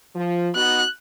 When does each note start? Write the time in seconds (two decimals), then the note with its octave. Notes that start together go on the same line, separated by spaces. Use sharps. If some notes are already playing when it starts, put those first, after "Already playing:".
0.16 F3
0.56 B3 D#4 F#4 F#6